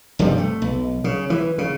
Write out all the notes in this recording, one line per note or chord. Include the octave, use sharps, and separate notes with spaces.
F1 G2 C3 G3
A3
B1
C#3
E3
C#3